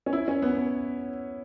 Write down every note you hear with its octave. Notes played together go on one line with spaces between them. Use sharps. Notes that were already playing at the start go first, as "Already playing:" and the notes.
C#4
E4
C#4
B3
B3